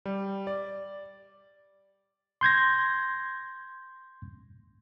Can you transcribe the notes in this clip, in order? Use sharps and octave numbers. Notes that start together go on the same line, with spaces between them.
G3
D5
C6 G6 G#6 A#6